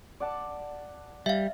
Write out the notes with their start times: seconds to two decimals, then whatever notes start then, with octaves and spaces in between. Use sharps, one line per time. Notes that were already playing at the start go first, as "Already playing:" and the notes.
0.20 D5 F#5 A5
1.26 G3 E5 F5